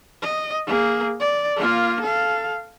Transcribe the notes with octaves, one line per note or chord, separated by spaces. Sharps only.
D#5
A#3 G#4
D5
A#3 F4
A4 F5